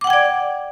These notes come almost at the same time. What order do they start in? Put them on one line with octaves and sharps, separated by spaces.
D6 F#5 G5 G#6 D5